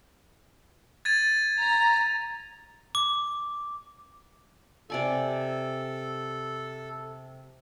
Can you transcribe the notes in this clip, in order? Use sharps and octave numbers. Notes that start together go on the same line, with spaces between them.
G#6 A6 D#7
A#5
D6
C3 A4 D5 G#5